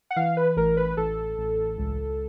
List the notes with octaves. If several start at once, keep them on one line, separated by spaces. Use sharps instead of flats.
F#5
E3 F5
B4
A1 A#4
B4
A1 A4
A1
C#2